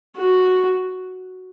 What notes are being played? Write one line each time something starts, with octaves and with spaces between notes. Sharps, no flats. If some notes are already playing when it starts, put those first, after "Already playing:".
F#4